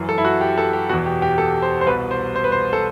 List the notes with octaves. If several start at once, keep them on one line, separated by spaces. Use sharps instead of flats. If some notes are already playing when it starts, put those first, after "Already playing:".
Already playing: F#2 E3
A4
E4
F#4
G4
A4
G4
E2 B2 F#4
G4
G4
A4
C5
C5
C2 B2 B4
C5
C5
B4
C5
A4